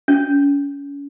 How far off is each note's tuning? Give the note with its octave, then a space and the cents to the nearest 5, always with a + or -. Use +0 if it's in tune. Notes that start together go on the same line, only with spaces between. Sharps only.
C#4 +35